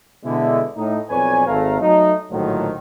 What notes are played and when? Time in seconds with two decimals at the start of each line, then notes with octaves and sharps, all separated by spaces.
0.25 B2 D3 G#3 E4
0.77 A2 D#4
1.10 B1 F2 B4 C#5 D5 G#5
1.48 G#1 A3 F5 A#5
1.81 F#3 A3 D#4
2.31 A#1 A2 D3 D#3 F3 F#3